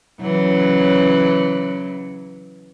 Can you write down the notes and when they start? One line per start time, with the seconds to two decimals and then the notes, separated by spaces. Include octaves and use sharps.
0.21 C#3 E3 F#3